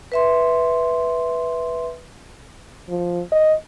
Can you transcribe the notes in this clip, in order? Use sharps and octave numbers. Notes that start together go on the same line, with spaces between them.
B4 E5 C6
F3
D#5